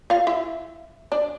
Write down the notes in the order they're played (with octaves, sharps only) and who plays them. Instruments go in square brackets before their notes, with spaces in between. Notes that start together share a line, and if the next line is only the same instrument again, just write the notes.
[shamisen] F4 F5
E4 E5
D4 D5